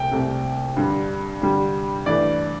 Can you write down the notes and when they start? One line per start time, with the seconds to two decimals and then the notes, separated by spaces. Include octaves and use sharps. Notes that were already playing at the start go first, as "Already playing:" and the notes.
Already playing: C2 C3 A3 G5
0.12 C2 C3 A3
0.77 G2 D3 G3
1.42 G2 D3 G3
2.06 G2 E3 A3 D5